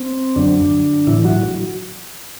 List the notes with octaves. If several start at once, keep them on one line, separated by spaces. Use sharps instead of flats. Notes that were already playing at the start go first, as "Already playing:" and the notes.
Already playing: C4
F#2 D3 F#3 D4
A2 E3 E4
F#3 F#4